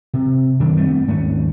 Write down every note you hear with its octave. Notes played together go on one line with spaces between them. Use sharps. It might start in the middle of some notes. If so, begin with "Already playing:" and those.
C3
F#2 D#3 D4
G3 A3 B3 C4
D#2 G#2 A3 C#4